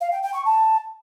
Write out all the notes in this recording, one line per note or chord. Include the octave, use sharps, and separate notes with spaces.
F5
G5
G5
C#6
A5